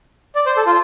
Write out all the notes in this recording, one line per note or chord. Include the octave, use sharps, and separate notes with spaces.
D5
C5
A4
F4